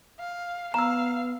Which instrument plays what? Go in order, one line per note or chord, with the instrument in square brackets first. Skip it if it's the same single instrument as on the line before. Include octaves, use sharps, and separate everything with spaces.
[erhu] F5
[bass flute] B3 [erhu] F5 [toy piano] A#5 E6